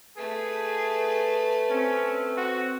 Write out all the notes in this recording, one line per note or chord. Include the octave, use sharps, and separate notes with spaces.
A3 G#4 B4
C4 C#4
F#4